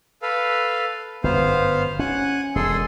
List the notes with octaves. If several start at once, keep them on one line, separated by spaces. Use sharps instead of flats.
A4 B4 F5
G1 F#2 B3 C5 F5
C#4 F#5 G#5 F#6
E1 G#4 A4 C6